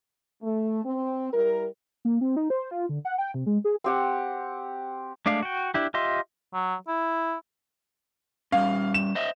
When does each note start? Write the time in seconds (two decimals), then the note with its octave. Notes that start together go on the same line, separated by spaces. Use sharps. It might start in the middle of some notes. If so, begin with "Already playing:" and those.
0.42 A3
0.84 C4
1.33 G3 E4 A#4
2.05 A#3
2.21 C4
2.36 D#4
2.50 C5
2.71 F4
2.89 D3
3.05 F#5
3.18 G5
3.34 C3
3.46 G#3
3.64 G#4
3.84 C4 G4 F#5
5.26 G#3 A3 D4 D5 F5
5.43 F#4 G5
5.74 D4 E4 G4
5.94 F4 G4 D#5 E5 C6
6.54 F#3
6.88 E4
8.52 G3 C#4 F5
8.94 E7
9.15 C5 D#5 E5